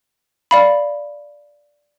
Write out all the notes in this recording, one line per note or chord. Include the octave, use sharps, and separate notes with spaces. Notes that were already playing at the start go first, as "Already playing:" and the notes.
D5 F5 B5